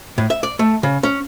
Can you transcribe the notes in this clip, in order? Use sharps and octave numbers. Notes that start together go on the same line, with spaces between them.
A2
E5
D5
A3
C#3
C#4